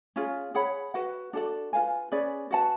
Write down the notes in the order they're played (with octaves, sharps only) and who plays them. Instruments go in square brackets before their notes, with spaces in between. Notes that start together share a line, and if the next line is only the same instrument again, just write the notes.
[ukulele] C#4 F4 G#4
G#4 C#5 F#5 B5
F#4 B4 F#5
D4 F#4 A4 D5
F4 B4 F5 G#5
C#4 G#4 B4 D5
F#4 B4 F#5 A5